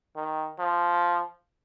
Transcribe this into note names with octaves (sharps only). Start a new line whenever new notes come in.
D#3
F3